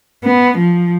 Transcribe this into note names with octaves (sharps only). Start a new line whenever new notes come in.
B3
F3